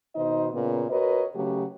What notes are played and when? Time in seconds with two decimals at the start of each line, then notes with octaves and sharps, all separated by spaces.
0.16 B2 D#3 D#4 C5 D#5
0.53 A#2 C#3 A#3 B3
0.90 F#4 A#4 B4 C#5 D#5
1.35 C#3 F#3 A3 F#4 G4